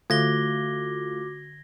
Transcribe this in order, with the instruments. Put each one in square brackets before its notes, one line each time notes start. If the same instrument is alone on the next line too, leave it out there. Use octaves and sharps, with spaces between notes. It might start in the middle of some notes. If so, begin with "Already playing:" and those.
[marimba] D3 [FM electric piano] A3 F4 [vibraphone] F#4 D6 [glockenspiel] G#6 A#6 G7